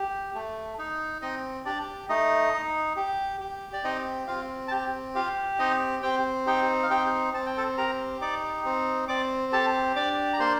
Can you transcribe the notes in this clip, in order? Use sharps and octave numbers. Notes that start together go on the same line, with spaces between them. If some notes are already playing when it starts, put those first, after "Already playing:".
Already playing: G4
A3
D#4
C4 D#4 D#5
D4 G4 D5
A3 D#4 D#5
D#4
G4
G4
D5
C4 D#4 D#5
C4 F4 F5
A5
G4 G5
F4 G4 F5
C4 D#4 D#5
C4 G4 G5
D#4 G4 G5
F5
C4 G4 G5
C4 A5
G5
A4 A5
G4 A#4 A#5
D#4 D5 D6
C4
C4 D5 D6
G4 A4 A5
D4 D5 D6
A#5
A#3 C5 C6